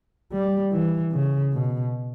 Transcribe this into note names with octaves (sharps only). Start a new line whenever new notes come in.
G3
E3
C#3
B2